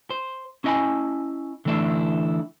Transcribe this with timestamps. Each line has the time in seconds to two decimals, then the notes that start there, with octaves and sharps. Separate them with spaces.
0.10 C5
0.64 C#4 E4 D#5 G5 G#5 B5
1.65 D3 E3 A3 D4 E4